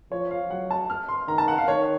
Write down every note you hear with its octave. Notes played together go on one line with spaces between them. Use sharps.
F3 C#5
F5
F#3 F#5
A5
F6
C6
D#3 A#5
A5
F#5
F5
D#3 C#5